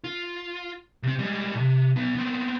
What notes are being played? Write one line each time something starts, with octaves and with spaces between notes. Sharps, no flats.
F4
C3 C4
G3 G#3
A2 C3
B1 B3
B3 C4